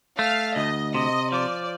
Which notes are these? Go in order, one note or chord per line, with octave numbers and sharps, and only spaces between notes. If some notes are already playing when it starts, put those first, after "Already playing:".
A3 F5
D2 D#5
C3 D#5
F3 D5